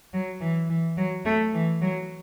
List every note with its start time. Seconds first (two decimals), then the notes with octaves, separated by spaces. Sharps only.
0.13 F#3
0.41 E3
0.69 E3
0.97 F#3
1.25 A3
1.54 E3
1.82 F#3